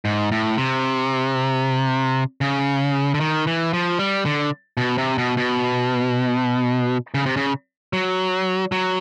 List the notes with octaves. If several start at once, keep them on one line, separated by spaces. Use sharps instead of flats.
G#2
A2
C3
C#3
D3
D#3
E3
F3
G3
D3
B2
C3
B2
B2
C#3
C3
C#3
F#3
F#3